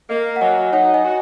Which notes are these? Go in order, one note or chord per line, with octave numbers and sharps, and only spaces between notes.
A#3 D#5
F#5
F#3 D#5 G#5
D#4 C#5 F#5
D#5 G#5
F#4